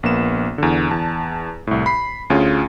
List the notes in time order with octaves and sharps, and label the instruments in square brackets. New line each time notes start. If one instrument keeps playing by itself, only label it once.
[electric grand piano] A#1 A#3 B3 E7
E2 D3
E2 A5
C2 A2
B5 C7
D2 C#4 F4 G#4